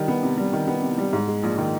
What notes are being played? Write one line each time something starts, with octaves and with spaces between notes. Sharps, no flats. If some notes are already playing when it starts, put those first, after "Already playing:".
Already playing: D#3 G3
B3
C3
G3
D#3
B3
C3
G3
G#2
G#3
A#1
D#3